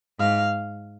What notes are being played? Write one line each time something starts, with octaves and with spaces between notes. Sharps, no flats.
G#2 F5